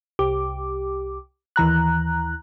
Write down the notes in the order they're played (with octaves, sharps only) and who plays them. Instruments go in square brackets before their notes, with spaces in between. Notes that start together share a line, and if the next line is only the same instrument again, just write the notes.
[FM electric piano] C2 G4 D6
D#2 E3 A#5 F#6